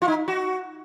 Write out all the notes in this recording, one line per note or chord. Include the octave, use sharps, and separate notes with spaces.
F4
D#4
F#4